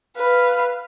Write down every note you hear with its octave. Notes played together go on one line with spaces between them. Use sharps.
B4 F5